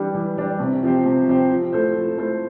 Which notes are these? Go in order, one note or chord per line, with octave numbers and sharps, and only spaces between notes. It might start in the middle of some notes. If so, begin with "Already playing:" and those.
Already playing: E3 G3 D4 G4
E3
G3 D4 G4
C3
F3 C4 G4 C5
C3
F3 C4 G4 C5
F3
A3 E4 A4 C5
F3
A3 E4 A4 C5